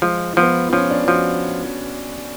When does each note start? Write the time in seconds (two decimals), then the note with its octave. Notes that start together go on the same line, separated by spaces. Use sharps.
0.02 F3 G#3
0.37 F3 B3
0.73 F3 C#4
0.91 D4
1.08 F3 F#4